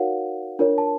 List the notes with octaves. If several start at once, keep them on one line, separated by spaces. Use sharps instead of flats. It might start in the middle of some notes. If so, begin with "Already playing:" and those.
Already playing: D#4 F#4 A#4 C#5 F5 F#5
D4 F4 A#4 C#5
A5